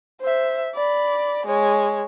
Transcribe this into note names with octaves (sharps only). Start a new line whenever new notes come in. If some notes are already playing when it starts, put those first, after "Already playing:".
C5 E5
D5 B5
G#3 C#5